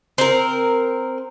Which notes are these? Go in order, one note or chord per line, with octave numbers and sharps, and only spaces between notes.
C4 A#4